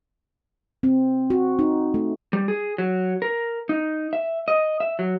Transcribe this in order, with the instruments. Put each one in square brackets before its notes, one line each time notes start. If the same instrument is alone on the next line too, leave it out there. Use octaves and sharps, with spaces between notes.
[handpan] C4
F#4
D#4
A3
[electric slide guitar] G3
G#4
F#3
A#4
D#4
E5
D#5
E5
F#3